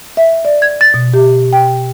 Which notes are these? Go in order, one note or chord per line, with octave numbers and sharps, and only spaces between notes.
E5
D5
G#6
A6
B2
G4
G5